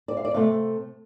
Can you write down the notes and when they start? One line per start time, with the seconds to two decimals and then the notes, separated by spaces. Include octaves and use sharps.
0.08 D5
0.17 F5
0.25 D5
0.34 C3 A3 F5